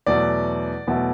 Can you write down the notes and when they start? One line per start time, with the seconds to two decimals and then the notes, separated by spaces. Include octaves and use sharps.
0.06 E2 B2 F#3 A3 D5
0.87 E2 B2 F#3 A3